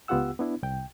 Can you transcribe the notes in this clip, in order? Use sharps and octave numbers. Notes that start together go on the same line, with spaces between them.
C#2 B3 F4 G4 F#5 E6
B3 D4 E4
C2 G5